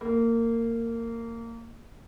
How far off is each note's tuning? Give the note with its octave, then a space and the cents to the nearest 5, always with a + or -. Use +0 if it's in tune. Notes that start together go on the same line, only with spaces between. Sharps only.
A#3 -20